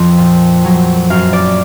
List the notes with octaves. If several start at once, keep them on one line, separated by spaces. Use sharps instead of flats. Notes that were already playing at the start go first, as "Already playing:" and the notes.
Already playing: F2
A#2
F#3
F#2 F5
D5